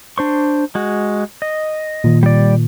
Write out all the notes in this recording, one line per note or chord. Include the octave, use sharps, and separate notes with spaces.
D4 C5 C#6
G#3 F#4
D#5
A#2 D#3
G3 D5